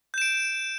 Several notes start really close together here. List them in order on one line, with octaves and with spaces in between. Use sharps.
G6 E7 D7